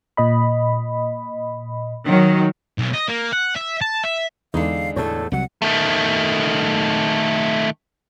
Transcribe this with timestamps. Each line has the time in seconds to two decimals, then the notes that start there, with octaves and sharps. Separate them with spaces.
0.17 A#2 D#5 B5
2.05 D#3 F#3
2.78 B1
2.94 D#5
3.08 A#3
3.32 F#5
3.56 E5
3.81 A5
4.04 E5
4.54 E2 D3 G#3 D#4 F5
4.96 E2 A2 A4 C#5 A5
5.32 C2 F#3 F#5
5.62 D#3 A3